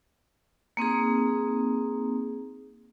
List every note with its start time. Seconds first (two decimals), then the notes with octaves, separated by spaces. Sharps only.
0.77 A#3 C4 D#4 G#4